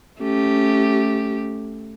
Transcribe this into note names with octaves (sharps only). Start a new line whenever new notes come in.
A3 C#4 G4